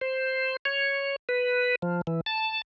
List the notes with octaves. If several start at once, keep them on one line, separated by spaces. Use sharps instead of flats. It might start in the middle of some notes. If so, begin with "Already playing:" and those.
C5
C#5
B4
F3
E3
A5